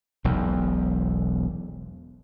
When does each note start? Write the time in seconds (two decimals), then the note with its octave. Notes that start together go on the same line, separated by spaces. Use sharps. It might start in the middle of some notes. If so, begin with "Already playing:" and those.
0.24 E1 B1 E2